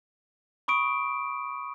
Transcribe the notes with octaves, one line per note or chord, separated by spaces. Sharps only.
B5 C#6 D#6 D7